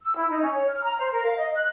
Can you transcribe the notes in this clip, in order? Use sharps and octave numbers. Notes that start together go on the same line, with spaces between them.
E6
E4
D#4
C#4
C#5
F6
A#5
C5
A#4
F5
D#5
F#6